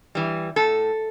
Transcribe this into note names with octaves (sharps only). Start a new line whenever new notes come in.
E3 G3
A2 A4